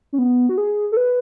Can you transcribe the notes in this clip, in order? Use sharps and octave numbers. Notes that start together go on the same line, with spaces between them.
C#4
B3
F#4
G#4
A4
B4